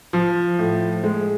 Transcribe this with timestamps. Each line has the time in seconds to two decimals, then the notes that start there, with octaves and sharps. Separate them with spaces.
0.13 F3
0.58 A2
1.04 G#3